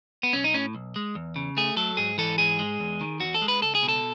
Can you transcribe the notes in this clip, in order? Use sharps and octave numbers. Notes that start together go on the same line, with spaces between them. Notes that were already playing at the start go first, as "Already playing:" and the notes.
B3
B1 C#4
D#4
A2 C#4
B1
G#3
E2
C#3
A3 G#4
F#3 A4
G#2 G#4
E3 A4
G#2 G#4
G#3
E2
D#3
E2 F#4
A4
G#3
B4
C#2 A4
G#4
B2
A4